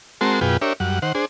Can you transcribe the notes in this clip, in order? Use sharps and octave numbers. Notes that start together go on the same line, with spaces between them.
G#3 C4 F#4 A#4 A5 C6
F#2 B2 F4 G#4 B4 G5
D4 G4 A#4 C#5 E5
F#2 G3 F#5
D#3 C5 F#5
D4 G#4 C5